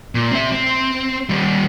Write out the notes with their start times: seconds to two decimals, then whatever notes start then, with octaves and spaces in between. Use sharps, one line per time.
0.15 A#2
0.32 C4 E5
0.52 C4
1.29 D#3 G3